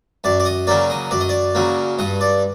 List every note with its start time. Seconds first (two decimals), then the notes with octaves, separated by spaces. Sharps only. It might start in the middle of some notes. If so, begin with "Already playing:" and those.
0.24 F#2 D5
0.40 D5
0.45 D#5
0.67 C#3 F#3 A#3 D5
0.90 D#5
1.11 F#2 D5
1.20 D#5
1.29 D5
1.55 C#3 F#3 A#3
1.99 G2 D#5
2.21 D5